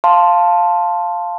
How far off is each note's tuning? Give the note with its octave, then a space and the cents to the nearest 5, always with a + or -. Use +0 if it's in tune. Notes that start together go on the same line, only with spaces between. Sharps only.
F5 +0 A5 +0 C6 +0